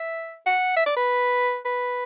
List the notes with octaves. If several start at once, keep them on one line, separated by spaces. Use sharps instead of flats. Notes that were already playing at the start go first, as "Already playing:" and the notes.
Already playing: E5
F#5
E5
D5
B4
B4